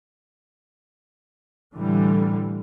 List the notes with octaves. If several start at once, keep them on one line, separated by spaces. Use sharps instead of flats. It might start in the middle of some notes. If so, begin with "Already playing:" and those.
A2 D3 E3 G3